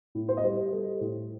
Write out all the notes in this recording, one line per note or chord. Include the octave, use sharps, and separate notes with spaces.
A2
C5
D#5
G3 C5
G3 A4
A2